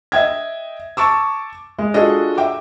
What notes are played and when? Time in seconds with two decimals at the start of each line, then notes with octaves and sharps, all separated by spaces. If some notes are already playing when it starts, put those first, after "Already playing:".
0.12 D#5 E5 G5 G#6
0.97 A5 C#6 D6 E6
1.79 G#3
1.94 D4 F4 F#4 G#4 A4 D#5
2.38 E5 G5 D6